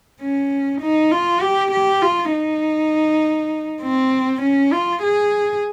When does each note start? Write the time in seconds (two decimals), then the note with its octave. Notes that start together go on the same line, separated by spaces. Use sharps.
0.21 C#4
0.81 D#4
1.11 F4
1.41 G4
1.72 G4
2.02 F4
2.32 D#4
3.82 C4
4.42 C#4
4.72 F4
5.03 G#4